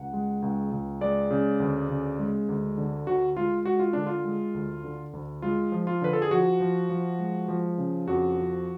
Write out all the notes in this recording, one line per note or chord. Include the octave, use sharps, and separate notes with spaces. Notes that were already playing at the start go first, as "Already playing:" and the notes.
Already playing: C#2 F#5
G#3
C#2
C#2
G#3 D5
C#3
D2
C#3
G#3
D2
D3
D2 F#4
G#3 F4
G#3 F#4
F4
D3 D4
F4
G#3
D2
D3
D2
G#3 F4
F3
F4
D3 B4
A4
G#4
F3 F#4
F3
F3
G#3
F3
C#3
F2 F#4
F3